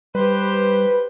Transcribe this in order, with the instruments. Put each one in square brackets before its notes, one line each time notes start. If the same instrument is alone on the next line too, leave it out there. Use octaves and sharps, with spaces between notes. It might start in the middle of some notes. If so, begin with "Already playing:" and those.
[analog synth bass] G3 [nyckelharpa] G4 C5 [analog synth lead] B4